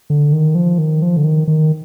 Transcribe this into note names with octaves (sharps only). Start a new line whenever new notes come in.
D3
D#3
F3
D#3
F3
D3
D#3
D#3